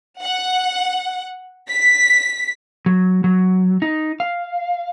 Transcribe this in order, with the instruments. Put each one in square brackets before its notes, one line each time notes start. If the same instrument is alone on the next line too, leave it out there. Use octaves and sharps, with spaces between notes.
[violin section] F#5
B6
[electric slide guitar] F#3
F#3
D#4
F5